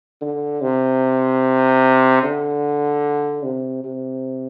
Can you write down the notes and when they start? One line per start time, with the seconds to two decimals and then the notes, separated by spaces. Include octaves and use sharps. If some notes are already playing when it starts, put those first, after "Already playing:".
0.21 D3
0.61 C3
2.23 D3
3.43 C3
3.84 C3